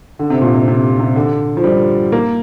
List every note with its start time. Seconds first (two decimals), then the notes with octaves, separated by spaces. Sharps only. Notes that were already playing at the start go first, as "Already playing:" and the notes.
0.19 D3
0.30 C3
0.42 A#2
0.54 C3
0.68 C3
1.00 C3
1.16 D3
1.57 F3
1.64 G3
2.12 A#3